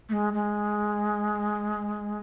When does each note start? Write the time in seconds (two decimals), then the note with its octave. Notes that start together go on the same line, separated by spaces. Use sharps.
0.09 A3
0.13 G#3
0.33 G#3